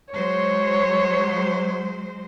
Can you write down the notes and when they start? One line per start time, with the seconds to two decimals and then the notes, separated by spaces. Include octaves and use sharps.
0.14 F#3 G#3 C5 C#5